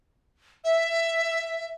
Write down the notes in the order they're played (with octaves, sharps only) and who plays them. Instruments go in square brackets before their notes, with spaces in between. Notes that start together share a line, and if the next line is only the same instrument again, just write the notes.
[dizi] E5